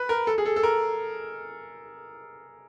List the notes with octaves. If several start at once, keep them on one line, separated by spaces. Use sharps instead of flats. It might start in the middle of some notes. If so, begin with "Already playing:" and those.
Already playing: B4
A#4
A4
G#4
A4
A4
A#4